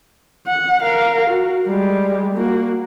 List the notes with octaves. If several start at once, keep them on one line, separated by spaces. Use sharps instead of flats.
F#5
A#4 F5
F#4
G3 G#3
A#3 F#4